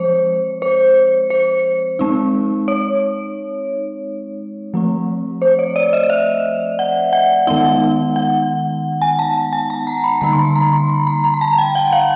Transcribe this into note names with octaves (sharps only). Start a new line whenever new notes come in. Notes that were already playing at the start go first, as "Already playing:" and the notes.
Already playing: F3 G#3 C4 C5 C#5
C5
C5
G#3 C4 D#4
C#5
F3 A3 C4
C5
C#5
D5
D#5
E5
F#5
F#5
D#3 G#3 B3 D#4 F#5
F#5
G#5
A5
G#5
A5
A#5
B5
D3 G3 A#3 D#4 A#5
C6
B5
A#5
C6
B5
A#5
A#5
A#5
A5
G5
F#5
F5